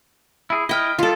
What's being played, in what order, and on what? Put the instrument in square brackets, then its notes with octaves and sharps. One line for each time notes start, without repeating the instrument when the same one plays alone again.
[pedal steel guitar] E4 G#4
[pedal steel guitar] E4 F6 [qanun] D#5 G5
[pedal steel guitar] D#3 G3 [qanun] F4 A4